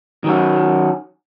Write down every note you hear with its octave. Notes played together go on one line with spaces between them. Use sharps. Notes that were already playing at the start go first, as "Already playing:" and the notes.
D#3 F#3 C#4 F#4